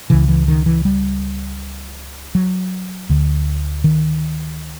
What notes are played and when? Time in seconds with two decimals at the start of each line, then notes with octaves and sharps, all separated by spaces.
0.10 C#2 C#3 E3
0.28 E3
0.48 D#3
0.66 E3
0.85 G3
2.35 F#3
3.09 D2 D3
3.84 D#3